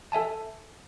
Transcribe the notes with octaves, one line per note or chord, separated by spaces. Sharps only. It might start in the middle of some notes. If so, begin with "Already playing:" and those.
A4 E5 G#5 A5